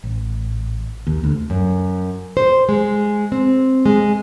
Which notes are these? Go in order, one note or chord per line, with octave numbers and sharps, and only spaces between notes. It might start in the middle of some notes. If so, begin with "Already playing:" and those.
A1
D#2
D2
F#2
C5
G#3
C4
G#3